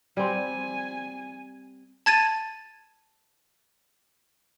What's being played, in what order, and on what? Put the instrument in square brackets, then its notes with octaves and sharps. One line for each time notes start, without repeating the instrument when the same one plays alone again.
[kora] G3 C4 [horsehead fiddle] G#5
[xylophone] A5 G#6 A6 D#7